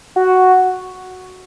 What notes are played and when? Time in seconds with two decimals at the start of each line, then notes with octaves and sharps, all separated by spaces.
0.16 F#4